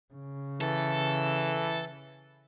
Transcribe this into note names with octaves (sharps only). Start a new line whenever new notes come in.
C#3
E3 A4